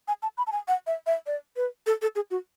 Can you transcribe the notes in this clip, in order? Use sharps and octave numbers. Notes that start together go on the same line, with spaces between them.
G#5
A5
B5
A5
G#5
F#5
E5
E5
D5
B4
A4
A4
G#4
F#4